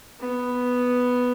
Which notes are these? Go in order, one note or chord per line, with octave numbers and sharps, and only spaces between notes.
B3